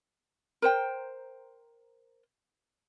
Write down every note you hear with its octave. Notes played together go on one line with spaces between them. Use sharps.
A#4 C5 G5